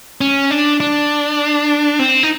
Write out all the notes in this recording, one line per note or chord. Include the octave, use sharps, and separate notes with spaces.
C#4
D4
D4
C4
D#4